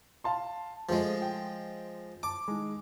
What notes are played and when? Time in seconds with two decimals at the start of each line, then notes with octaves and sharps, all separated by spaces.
0.24 F5 A5 C6
0.89 F3 G#3 A3 G#4
1.22 G5
2.23 A5 D6
2.48 D#3 G#3